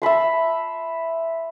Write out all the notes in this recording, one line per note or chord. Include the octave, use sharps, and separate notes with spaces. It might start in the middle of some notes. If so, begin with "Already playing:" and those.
E5 A5 B5 C6